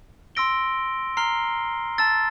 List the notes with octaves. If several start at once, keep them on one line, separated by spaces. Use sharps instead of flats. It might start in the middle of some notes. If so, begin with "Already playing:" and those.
C6 E6 A#6 D7 G7
A#5 F6 C7 G7
A5 E6 A6